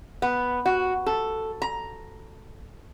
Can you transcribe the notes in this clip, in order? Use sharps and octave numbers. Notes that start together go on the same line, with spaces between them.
B3
F#4
A4
A#5